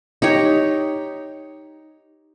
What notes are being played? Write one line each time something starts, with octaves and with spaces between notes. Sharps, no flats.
D#4 G4 C#5